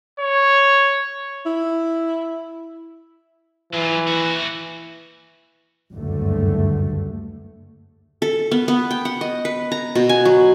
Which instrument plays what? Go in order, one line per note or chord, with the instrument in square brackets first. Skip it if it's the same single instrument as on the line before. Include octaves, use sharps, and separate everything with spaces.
[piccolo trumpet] C#5
[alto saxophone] E4
[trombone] E3 [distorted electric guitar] F#3 F4
[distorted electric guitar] D#2 F#4
[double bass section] F#1 D2 G2 A#2 D3 A3
[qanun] A4
B3
B3
G5
F#5
D#5
B4
A#5
B2
G#5
F#3